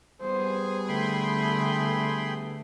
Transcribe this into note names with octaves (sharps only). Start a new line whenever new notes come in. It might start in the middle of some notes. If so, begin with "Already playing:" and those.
G3 B3 G#4 C5
D3 A3 G5 B5 C6